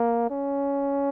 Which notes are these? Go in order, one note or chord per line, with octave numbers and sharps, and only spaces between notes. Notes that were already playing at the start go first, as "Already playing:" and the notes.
Already playing: A#3
C#4